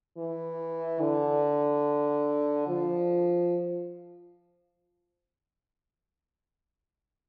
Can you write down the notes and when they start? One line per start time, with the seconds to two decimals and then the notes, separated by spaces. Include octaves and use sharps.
0.18 E3
1.01 D3
2.68 F3